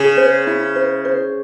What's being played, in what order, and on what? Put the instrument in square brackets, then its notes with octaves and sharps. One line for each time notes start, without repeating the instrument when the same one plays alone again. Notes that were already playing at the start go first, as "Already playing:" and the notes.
Already playing: [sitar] C#3 [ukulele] G#4
[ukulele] C5
E4
C5
C5